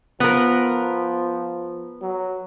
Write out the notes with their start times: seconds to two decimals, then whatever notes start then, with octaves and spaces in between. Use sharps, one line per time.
0.20 F3 B3 A#4
2.02 F#3